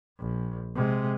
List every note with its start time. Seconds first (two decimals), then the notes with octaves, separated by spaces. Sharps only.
0.19 A#1
0.75 C3 G#3